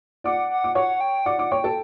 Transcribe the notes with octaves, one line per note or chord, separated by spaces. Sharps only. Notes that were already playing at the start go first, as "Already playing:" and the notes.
D5 F#5 D6
F#5
D6
C#5 F#5 C#6
G5
D5 F#5 D6
D5 D6
C#5 G5 C#6
A4 A5